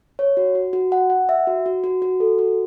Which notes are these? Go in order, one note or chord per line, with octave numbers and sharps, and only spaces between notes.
C#5
F#4
F#4
F#4
F#5
F#5
E5
F#4
F#4
F#4
F#4
A4
F#4